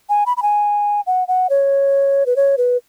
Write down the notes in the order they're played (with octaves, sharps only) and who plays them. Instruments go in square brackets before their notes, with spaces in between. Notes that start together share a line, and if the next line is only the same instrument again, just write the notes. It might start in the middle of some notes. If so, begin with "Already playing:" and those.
[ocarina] G#5
B5
B5
G#5
F#5
F#5
C#5
B4
C#5
B4